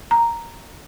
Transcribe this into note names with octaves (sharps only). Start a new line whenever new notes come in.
A#5